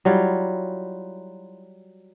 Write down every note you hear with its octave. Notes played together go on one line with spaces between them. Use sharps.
F#3 G3 E4 F4